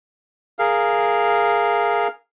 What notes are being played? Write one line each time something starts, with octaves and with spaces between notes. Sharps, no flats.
G#4 A#4 F5